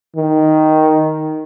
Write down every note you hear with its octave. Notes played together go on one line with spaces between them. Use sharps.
D#3